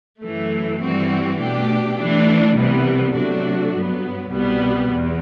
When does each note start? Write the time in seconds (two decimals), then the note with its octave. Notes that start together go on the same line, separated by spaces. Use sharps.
0.22 F#2 E3 A3
0.81 G2 E3 G3 C4 F#4
1.39 B2 A3 D4 G4
1.98 E3 A3 D4
2.57 C2 C3 E3 G3 B3
3.15 C3 F#3 A3 D4 F#4
3.74 G2 F#3 B3
4.32 C2 B2 G3 B3
4.91 E2